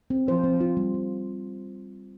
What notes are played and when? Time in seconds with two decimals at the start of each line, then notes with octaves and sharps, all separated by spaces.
0.10 C4
0.28 F3 C5
0.44 C4
0.61 F4
0.77 G3
0.94 G3